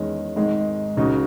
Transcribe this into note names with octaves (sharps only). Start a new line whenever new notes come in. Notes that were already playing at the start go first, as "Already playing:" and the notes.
Already playing: E2 D#3 G#3 C#4
G#1 G#2 D#3 G#3
C#2 C#3 G#3 D#4 F#4